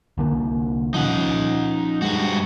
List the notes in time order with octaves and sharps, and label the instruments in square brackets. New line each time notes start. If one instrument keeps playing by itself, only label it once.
[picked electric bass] C2 D3 A#3
[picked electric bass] F3 C#4 [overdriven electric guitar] D#4 F#5
[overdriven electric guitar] G2 F#4 [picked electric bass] G#3